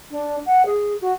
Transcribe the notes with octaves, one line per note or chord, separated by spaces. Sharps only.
D4
F#5
G#4
F#4